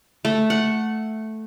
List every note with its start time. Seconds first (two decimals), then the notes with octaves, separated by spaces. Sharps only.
0.25 A3
0.50 F#5